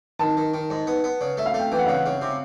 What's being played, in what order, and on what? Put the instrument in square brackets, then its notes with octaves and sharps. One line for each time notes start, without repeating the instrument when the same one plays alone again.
[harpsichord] D#3 [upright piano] A5
[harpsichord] D#3
D#3
G#2
B3
B3
C#3
[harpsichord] A3 [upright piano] E5
[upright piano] F5
[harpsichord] A3 [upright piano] G5
[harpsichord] E3 [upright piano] G5
[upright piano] F#5
[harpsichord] C#3 [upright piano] F5
[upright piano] F#5
[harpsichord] C#3
C3